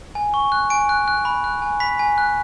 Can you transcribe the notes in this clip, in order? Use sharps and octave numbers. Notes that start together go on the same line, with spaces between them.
G#5
C#6
F#6
G#5 D7
F#6
F#6
B5
F#6
G#5
B5 B6
G#5
F#6